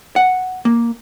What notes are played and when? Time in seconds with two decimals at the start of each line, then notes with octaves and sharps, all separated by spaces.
0.16 F#5
0.65 A#3